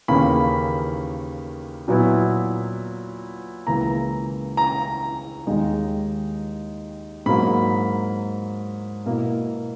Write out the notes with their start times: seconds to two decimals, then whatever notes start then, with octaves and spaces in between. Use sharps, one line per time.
0.08 D#2 C#3 E3 A#3 C#4 B5
1.88 A#2 F#3 B3 E4
3.67 C#2 C#3 E3 A#3 E4 A#5
4.57 A#5
5.47 D#2 D#3 G#3 D#4
7.26 G#2 F#3 A#3 B5
9.05 B2 A#3 E4